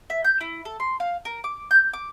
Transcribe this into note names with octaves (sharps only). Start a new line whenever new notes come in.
E5
G6
E4
A4
C6
F5
A#4
D6
G6
D6